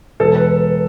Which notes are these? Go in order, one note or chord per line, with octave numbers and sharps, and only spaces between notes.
E1 A4
B4